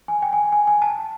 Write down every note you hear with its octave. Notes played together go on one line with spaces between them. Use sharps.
G#5
G5
G#5
G#5
G#5
A5